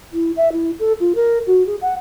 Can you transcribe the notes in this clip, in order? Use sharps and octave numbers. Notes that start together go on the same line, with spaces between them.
E4
E5
E4
A4
F4
A#4
F#4
G#4
F#5